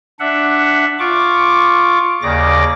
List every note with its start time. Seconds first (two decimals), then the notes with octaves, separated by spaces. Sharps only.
0.20 D4 E5 F#5
0.99 F4 C#6 D6
2.22 D#2 C#3 D5 D6 A#6